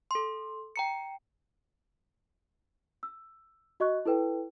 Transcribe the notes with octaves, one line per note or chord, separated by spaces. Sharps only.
A4 C6
G5 A#5 C#7
E6
F#4 D#5 C#6 F#6
E4 A4 B4 G5